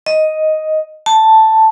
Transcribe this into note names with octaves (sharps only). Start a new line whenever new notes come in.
D#5
A5